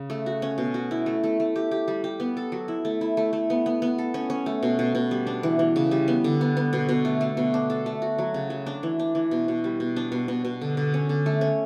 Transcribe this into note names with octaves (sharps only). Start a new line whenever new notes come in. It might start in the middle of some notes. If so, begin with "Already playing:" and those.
Already playing: C#3
A3
F#4
C#4
B2
F#4
E4
A3
A3
A3
G4
G4
G3
G4
B3
A4
F#3
E4
A3
E4
A3
A3
B3
B3
B3
A4
C#4
C#4
A3
B2
B2
B2
G3
D4
E3
E3
C#3
G3
B3
D3
B3
B3
B2
B2
A3
A3
B2
D4
A4
A3
F#4
F#3
C#3
F#3
D4
E3
D4
E3
B2
B2
G3
B2
D4
B2
B2
B2
D3
D3
C#4
D3
A3
C#4